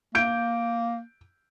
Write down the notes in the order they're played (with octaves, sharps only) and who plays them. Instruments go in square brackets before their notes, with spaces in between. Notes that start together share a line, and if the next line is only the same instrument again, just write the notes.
[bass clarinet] A#3 [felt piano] G6 D7